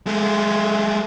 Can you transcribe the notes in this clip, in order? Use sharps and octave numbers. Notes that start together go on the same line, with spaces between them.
G#3 A3